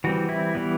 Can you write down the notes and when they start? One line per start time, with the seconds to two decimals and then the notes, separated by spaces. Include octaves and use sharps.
0.04 E3 G3 C4 F#4
0.29 E4
0.55 E3 G3 B3